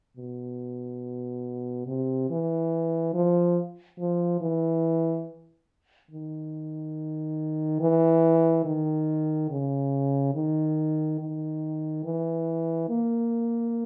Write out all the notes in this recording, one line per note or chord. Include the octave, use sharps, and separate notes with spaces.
B2
C3
E3
F3
F3
E3
D#3
E3
D#3
C#3
D#3
D#3
E3
A#3